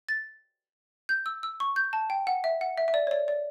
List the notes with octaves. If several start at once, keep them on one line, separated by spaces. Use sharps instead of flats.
A6
G6
E6
E6
C#6
G6
A5
G5
F#5
E5
F#5
E5
E5
D5
C#5
D5
D5